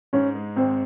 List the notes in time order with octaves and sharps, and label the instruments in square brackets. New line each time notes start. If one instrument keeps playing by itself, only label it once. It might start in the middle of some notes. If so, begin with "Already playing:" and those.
[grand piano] G#2 [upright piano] C#4
[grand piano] G#3
[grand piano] G#1 [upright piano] C4